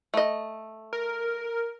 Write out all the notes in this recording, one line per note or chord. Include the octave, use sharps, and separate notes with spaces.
A3 D#5
A#4